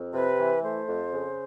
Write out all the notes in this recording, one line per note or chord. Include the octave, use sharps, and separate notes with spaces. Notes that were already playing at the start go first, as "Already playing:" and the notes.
Already playing: F2
C3 B4
E3
A3 C5
F2
C#3